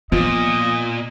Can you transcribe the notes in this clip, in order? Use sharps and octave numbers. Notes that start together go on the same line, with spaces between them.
A#2 F3 B3 D#5